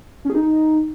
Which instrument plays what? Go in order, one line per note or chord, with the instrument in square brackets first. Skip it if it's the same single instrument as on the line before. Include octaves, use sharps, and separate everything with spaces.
[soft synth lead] C#4
G#4
D#4